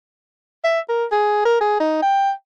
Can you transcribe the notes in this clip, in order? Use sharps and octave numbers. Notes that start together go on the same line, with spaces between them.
E5
A#4
G#4
A#4
G#4
D#4
G5